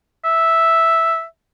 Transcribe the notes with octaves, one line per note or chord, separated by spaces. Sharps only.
E5